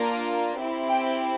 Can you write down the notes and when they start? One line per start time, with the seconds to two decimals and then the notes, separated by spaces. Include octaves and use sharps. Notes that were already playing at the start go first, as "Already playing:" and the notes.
Already playing: A#3 D4 F4 A#4
0.60 C4 E4 G4
0.89 G5